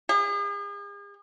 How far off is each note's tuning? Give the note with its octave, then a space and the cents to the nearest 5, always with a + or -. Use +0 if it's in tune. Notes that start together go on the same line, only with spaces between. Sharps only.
G#4 -45